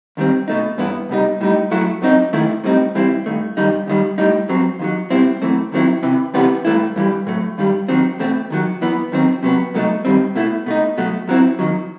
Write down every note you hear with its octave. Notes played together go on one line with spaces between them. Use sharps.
D#2 D#3 G3 C4
B2 A3 D#4
G2 E3 B3 E4
C2 B2 G3 D#4
A2 G3 D#4
F#2 F#3 A3 E4
F#2 F#3 C4 D#4
D#2 D#3 A3 E4
A2 G3 C4 D#4
G2 E3 G3 C4 E4
G2 D#3 A3
G2 D#3 G3 D#4
D#2 D#3 G3
A2 G3 D#4
G2 F#3 C4
D#2 D#3 F#3
B2 G3 C4 E4
F#2 E3 A3 C4
D#2 D#3 F#3 C4 E4
E2 C3 E3
C2 C3 E3 G3 B3
G2 E3 A3 E4
G2 E3 G3
A2 F#3 A3
G2 D#3 G3
D#2 D#3 F#3 C4
E2 B2 A3 C4
D#2 D#3 F#3
F#2 E3 B3
D#2 D#3 F#3 C4
C3 F#3 B3
C2 B2 F#3 A3 D#4
G2 D#3 G3 C4
B2 A3 E4
B2 A3 D#4
B2 F#3 A3
F#2 F#3 C4 E4
D#2 D#3 F#3